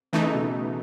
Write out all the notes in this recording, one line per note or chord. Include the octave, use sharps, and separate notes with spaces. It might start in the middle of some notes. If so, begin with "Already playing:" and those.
C#3 E3 A3 D#4
C#3
B2